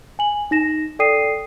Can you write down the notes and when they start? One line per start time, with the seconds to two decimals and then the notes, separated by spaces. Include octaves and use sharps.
0.19 G#5 F#7
0.51 D#4 A#6 E7
0.99 A4 D5 G5 D#6 C7 D#7